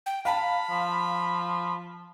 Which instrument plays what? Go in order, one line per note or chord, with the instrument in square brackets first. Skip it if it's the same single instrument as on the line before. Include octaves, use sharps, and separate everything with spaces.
[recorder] G5
[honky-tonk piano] F5 A5 [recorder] B5
[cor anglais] F3